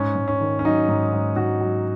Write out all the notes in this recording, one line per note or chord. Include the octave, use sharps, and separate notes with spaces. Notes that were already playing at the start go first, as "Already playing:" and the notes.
Already playing: G#2 C#4
G#2
C#4
D#3
C#4
F#3 D#4
G#2
G#2
G#2 F#4
F#3